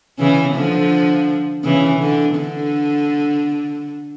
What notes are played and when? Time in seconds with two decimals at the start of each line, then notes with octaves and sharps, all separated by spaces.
0.19 C#3 E3
0.55 D3 F3
1.64 C#3 E3
2.00 D3
2.36 D3